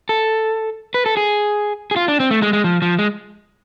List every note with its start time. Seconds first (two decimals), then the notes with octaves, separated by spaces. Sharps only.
0.09 A4
0.94 B4
1.06 A4
1.17 G#4
1.91 G#4
1.96 F4
2.08 D4
2.20 C4
2.31 A3
2.42 G#3
2.53 G#3
2.64 F3
2.82 F3
2.99 G#3